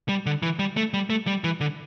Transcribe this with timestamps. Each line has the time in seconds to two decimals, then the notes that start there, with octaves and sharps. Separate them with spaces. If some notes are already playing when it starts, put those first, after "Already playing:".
0.09 G3
0.26 D3
0.43 E3
0.59 G3
0.77 A3
0.94 G3
1.10 A3
1.27 G3
1.44 E3
1.61 D3